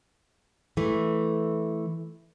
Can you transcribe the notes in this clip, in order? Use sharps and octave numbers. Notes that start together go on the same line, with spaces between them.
E3 A3